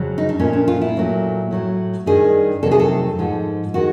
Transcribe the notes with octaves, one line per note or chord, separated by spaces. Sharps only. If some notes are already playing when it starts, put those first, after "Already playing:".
Already playing: F2 C#3 F#3
D#4
D4
A#2 F3 A3 C#4
D4
F4
E4
A#2 F#3 A3
A2 F#3 A3
G2 D#3 G3 G#4
F2 C3 D#3 F#3 A3 A4
G#4
A4
G#2 F3 G#3
D#3 G#3 F#4